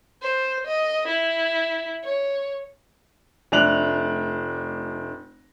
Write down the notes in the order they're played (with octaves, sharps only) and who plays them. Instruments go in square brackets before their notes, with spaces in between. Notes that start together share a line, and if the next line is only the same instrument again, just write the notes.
[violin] C5
D#5
E4
C#5
[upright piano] F1 A3 D4 F#6 F7 F#7